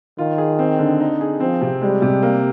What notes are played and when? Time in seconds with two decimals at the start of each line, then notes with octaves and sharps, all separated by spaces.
0.18 D#3 F4
0.38 G#4
0.59 C4
0.79 D3
1.00 D#4
1.21 G#4
1.40 F3 C4
1.61 C3
1.81 G3 G#3
2.02 C3
2.22 A#3